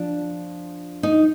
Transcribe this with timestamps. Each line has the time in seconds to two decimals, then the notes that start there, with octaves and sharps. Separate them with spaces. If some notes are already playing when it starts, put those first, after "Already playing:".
Already playing: F3 D4
1.03 D#4